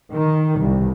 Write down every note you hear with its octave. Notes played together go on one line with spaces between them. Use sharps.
D#3
C2